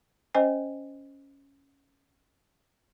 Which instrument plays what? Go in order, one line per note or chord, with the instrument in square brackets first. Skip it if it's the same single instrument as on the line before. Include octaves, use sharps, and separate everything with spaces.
[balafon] C#4 C5 D#5 G#5